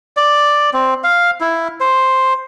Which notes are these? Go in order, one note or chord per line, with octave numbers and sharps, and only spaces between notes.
D5
C4
F5
E4
C5